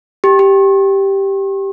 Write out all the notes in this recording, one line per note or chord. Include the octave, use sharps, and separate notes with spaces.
G4
G4